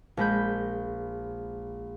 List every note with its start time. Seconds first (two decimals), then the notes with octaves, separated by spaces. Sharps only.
0.17 A#1 G#3 B5 G6